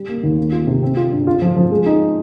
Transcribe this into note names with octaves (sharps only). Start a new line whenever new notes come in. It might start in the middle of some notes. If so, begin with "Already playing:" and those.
Already playing: G3
A#3
D#2
A#3
F4
C3
C4
F4
G2
F4
F3
F3
G#3
D#4